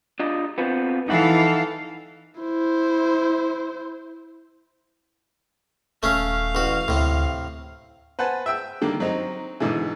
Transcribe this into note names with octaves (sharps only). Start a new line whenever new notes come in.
D4 F4 D#5
B3 C4 F4
E3 D#4 A4 F5 F#5
E4 C5
D#1 A3 C#4 F5
A1 F#4
D2 A2 C3
B4 C5 F#5 G#5 A5
E5 G5 E6
D3 D#3 G3 A#3
F#3 C4 D#4
G#2 B2 D3 E3